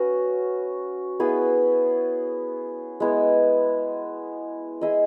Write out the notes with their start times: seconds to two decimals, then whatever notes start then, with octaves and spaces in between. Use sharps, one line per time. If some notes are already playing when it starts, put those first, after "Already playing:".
Already playing: C#4 F#4 B4
1.20 B3 E4 G#4 B4
3.00 G#3 B3 E4
4.81 E4 G#4 D#5